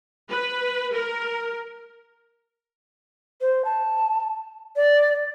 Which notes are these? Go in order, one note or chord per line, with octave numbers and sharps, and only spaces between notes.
B4
A#4
C5
A5
D5